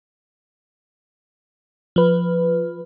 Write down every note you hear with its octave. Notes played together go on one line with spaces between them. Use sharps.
F3 B4